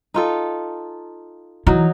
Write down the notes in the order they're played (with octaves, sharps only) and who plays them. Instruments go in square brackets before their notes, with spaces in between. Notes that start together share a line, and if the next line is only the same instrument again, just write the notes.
[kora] D#4 F4 A4
[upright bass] E3 [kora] F#3 D#4